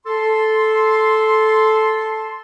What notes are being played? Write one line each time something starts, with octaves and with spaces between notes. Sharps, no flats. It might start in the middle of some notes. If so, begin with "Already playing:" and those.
A4 C6